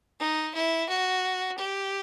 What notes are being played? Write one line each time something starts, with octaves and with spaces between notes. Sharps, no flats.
D#4
E4
F#4
G4